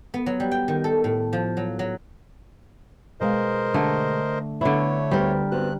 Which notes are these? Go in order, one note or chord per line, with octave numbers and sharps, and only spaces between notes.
B3
F#3
G3
G5
D#3
A4
A2
F3
F#3
F#3
B2 G#3 A#4 C5 D#5 F5
D3 A3
D3 A3 B3 E4 C#5
D2 G3 B3 A#4 C5
G2 B3 C4 F#4 F#6